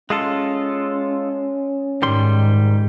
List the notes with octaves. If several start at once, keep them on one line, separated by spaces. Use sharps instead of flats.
G#3 C#4 F4 A4
G#2 D#3 G3 C6